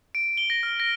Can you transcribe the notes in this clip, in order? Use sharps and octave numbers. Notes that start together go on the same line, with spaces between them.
D7
G7
A#6
F6
A#6